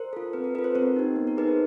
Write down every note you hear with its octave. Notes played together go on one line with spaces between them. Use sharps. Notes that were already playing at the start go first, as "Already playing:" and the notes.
Already playing: A#4 C5
F4 A4
C4 B4
A#4
F4 A4 B4
A#4 C5
C4 A#4 C5
D#4 G4
B3
A#4
D#4 G#4 B4
C5